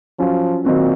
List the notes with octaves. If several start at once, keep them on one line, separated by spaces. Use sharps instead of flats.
F3 F#3 C#4 F4
A#2 D#3 F#3 C4 F#4